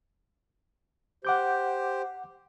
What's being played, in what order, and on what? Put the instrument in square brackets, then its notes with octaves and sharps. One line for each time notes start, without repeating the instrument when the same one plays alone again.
[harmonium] G4 C5 [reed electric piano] F#5 D6 G6